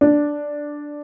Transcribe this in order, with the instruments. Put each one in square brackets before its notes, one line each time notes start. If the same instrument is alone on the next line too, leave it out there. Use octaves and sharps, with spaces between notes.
[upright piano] D4